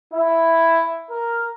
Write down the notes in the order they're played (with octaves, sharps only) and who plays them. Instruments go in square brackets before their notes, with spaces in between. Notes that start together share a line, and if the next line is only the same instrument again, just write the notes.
[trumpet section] E4
A#4